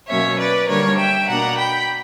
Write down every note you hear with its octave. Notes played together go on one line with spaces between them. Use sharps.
B2 F#3 A#3 C#4 C#5 E5
B4 D5
D3 G3 A#3 D4 A#4 C#5
E5 G5
B2 A#3 D4 F#5 A#5
G5 B5